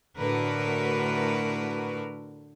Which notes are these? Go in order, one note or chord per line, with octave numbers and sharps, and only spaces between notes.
A2 D3 F#4 A#4 B4